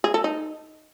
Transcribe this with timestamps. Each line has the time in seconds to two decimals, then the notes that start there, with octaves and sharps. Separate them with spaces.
0.04 G#4
0.14 A4
0.24 D#4